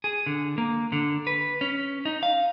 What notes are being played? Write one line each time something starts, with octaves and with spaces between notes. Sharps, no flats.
G#4
D3
A#3
D3
B4
C#4
D#4
F5